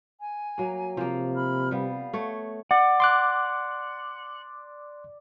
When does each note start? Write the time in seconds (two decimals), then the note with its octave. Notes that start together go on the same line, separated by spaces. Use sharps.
0.20 G#5
0.58 F#3 A#3
0.97 C3 F3 A#3
1.35 B5 F6
1.71 G3 B3 F5
2.13 A3 C#5
2.71 D5 F#5
3.00 C6 D6 F#6